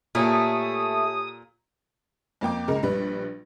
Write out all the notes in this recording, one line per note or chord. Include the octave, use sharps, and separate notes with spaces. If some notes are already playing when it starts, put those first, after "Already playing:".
A#2 A3 G4 C#5 G#5 D#6
F2 A#3 G5 D6
C#2 G#3 A#4
A#1 G3 B4